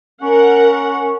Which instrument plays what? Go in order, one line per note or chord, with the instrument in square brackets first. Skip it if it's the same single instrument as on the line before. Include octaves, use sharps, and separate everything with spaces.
[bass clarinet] C#4 [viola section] A#4 F#5